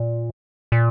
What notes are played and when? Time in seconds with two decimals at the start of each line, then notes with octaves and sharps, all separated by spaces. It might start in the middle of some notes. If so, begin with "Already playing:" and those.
Already playing: A#2
0.72 A#2